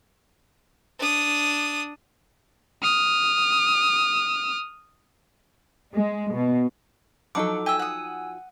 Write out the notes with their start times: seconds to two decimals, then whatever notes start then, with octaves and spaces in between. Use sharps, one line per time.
0.99 D4 D#6
2.83 D#6 F6
5.93 G#3
6.32 B2
7.35 F3 F#3 D4 D#4 A4 F#5 C#6 D6
7.66 E5 G5 G#5 E6
7.79 F#5 D#6